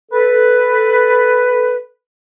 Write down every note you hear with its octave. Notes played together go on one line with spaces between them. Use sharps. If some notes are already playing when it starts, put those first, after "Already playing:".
A4 B4